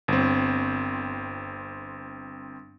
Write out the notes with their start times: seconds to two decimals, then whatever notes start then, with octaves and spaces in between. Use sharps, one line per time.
0.08 G1 C4